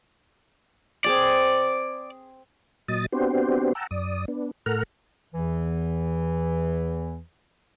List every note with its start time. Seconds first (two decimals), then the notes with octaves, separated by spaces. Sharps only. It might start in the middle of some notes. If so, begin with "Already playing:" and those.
1.05 C4 G#4 C#5 D5
2.88 A#2 F#3 D#5 D#6 A6
3.12 B3 C4 D4 F#4 G4 C5
3.75 F#5 G5 A5 A#5 E6
3.91 F#2 D5 D#6
4.28 B3 D4
4.66 A2 A4 A#4 F#5 A#5 F6
5.35 E2 E3